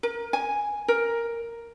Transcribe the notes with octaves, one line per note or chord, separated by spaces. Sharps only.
A#4
G#5
A#4